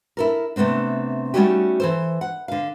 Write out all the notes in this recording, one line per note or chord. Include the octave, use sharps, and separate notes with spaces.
E4 A4 A#4
C3 A3 B3 C4 D4
G3 A3 C#4 D#4 F#4 G4
E3 A4 C5
F#5
D3 F5